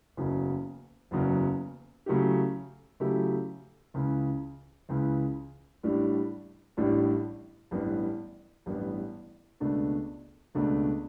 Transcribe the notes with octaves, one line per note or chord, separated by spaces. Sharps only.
F#1 E2 C#3 F#3
F#1 E2 C#3 F#3
C#3 F#3 A3 E4 G4
C#3 F#3 A3 E4 G4
C#2 C#3 E3
C#2 C#3 E3
A1 A2 G3 D4
A1 A2 G3 D4
A1 G2 E3 B3
A1 G2 E3 B3
C#2 B2 A3 D4
C#2 B2 A3 D4